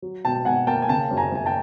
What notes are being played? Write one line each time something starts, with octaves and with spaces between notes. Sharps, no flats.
F#3
B2 G5 A5
B2 F#5 G#5
A#3 G5 A5
G#5
C#3 G5 A5
F#2
G#5 A#5
F#2 G#5
G5 A5